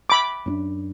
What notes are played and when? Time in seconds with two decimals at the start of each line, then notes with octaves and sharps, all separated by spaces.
0.10 B5 D6
0.46 F#2 C4 D4